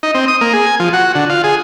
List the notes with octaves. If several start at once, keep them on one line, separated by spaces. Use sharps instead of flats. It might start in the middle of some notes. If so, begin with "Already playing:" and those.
D#4
C4
D#6
A#3
G#4
G#5
F3
F#4
D3
F4
G#4